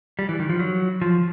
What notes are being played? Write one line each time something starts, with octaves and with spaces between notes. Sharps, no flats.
G3
E3
D#3
F3
F#3
F3